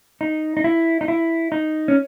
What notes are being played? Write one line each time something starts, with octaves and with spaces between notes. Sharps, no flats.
D#4
D#4
E4
D#4
E4
D#4
C#4